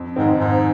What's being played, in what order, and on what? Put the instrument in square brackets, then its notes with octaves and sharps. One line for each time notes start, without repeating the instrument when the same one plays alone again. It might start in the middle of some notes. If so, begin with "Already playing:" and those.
Already playing: [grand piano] F2
[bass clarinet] G#2 [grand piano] D#3 G#3 C4
[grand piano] F2 [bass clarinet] G#2